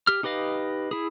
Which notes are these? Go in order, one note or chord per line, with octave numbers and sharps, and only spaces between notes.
G4 F6
D#4 G4 B4 D#5 F5
E4 G#4